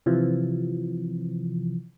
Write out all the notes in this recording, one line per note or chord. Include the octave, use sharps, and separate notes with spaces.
C3 E3 F3